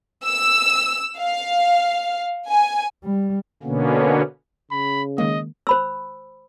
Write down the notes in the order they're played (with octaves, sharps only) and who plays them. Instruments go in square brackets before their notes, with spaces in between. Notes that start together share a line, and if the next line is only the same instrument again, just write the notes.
[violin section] E6
F5
G#5
[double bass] G3
[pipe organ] B2 D3 A#3 B3 C#4
[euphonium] C#3 [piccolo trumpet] B5
[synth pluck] D#3 G#3 A#3 [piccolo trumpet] D#5
[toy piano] C5 B5 E6